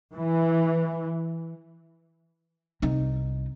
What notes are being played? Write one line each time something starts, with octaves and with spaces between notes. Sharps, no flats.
E3
C2 D#4